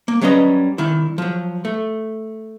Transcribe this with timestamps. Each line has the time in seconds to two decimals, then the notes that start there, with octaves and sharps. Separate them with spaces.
0.08 A#3
0.21 F#3 G3 C#4 B4 D#5
0.78 C2 D#3 E4
1.18 F3 F#3
1.65 A3